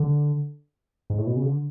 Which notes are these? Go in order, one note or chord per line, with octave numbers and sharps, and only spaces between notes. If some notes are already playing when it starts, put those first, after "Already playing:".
Already playing: D3
G#2
A2
B2
C#3
D3